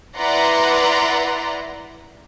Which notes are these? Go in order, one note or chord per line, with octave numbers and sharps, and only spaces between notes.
E4 B4 D5 F#5 A#5 C6